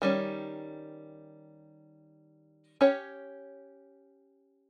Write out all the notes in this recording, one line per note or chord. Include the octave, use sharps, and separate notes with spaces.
D#3 G3 C#4
C#4 G4 C#5